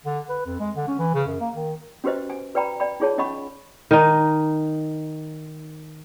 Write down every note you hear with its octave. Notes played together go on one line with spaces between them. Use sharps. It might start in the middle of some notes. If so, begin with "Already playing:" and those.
D3
B4
F2
G#3
D3
C#4
E3
C#3
F#2
A#3
D#3
C#4 F#4 G4 B4 C5 D#5
G#5
F#4 B4 D5 G5 A#5 B5
D5 G5 B5
D#4 F4 G#4 C#5 A5
C#4 D#5 F#5 B5 C#6
D#3 D#4